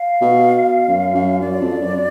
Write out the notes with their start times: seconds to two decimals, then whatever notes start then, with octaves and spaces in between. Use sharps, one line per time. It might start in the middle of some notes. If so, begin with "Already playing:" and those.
Already playing: F5
0.21 B2
0.88 F#2
1.14 F#2
1.41 F#2 D5
1.61 F2
1.81 F#2